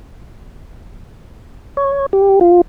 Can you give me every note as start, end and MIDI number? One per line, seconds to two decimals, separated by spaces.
1.77 2.06 73
2.13 2.39 67
2.41 2.61 65